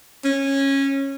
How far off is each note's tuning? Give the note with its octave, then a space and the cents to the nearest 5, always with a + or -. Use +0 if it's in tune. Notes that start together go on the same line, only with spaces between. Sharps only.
C#4 -15